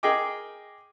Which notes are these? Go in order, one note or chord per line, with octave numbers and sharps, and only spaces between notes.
G#4 A#4 D#5 G5 D6